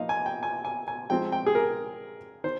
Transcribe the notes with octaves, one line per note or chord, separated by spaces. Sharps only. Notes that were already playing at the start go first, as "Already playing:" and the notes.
Already playing: F3 A#3 D#4 D#5 F5
G#5
G5
G#5
G#5
G#5
F3 G#3 C4 D#4 G5
G5
G#4
A#4
D#3 C5